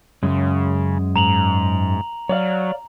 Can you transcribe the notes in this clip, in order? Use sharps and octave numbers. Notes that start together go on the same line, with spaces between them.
F#2 C#3 G#3
G#2 A#5 F7 F#7
F#3 C#5 D5 F5